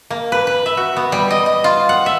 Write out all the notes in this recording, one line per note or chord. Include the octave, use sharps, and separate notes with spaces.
A#3
B4
B4
E5
F#4
B3
G3
D#5
D#5
F4
F#5
E5